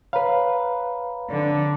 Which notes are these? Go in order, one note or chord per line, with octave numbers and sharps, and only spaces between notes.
B4 C#5 F5 A#5 B5
D3